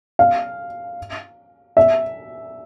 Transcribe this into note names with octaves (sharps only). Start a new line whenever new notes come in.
F5
E5